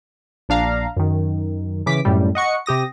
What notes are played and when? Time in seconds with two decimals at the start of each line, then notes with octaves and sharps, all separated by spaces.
0.49 A#1 D4 F5 A#5
0.97 F#2 D#3
1.86 C#3 E3 D6 B6
2.05 F#2 A2 G3
2.35 D#5 F#5 C#6 C#7
2.66 C3 G4 D#6 A#6